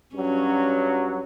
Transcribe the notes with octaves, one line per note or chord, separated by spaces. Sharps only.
G2 F#3 C#4